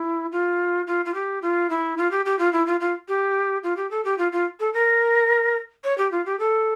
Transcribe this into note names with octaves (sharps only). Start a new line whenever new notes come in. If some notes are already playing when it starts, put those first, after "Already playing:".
Already playing: E4
F4
F4
F4
G4
F4
E4
F4
G4
G4
F4
E4
F4
F4
G4
F4
G4
A4
G4
F4
F4
A4
A#4
C#5
G4
F4
G4
A4